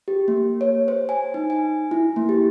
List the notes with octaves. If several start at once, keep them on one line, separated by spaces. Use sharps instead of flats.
G4
A#3
C#5
C5
G#5
D#4
G#5
E4
A#3
G4